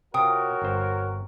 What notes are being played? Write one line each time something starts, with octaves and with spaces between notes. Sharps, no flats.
C3 F4 F#4 A#4 C#5 G5 D#6
G1 C4 C5